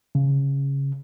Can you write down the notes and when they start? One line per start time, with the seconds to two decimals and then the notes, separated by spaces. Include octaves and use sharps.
0.15 C#3